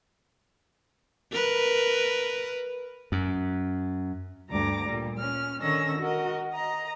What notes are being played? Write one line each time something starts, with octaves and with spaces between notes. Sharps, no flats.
A#4 B4
F#2
D2 G2 G3 A#5 D6 A#6
A#2 G3
C#4 F6
D3 D#3 C#4 C#6 E6 A#6
F#4 A#4 D#5
D#5 A#5